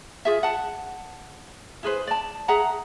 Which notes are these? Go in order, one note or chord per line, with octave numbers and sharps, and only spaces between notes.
F4 G#4 E5
F#5 A5
E4 G#4 B4 C5
D5 A5
G#4 E5 F#5 A#5